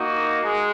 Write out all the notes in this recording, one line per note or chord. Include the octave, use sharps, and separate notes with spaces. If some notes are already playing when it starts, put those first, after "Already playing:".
Already playing: A#3 D#4 F#4
G#3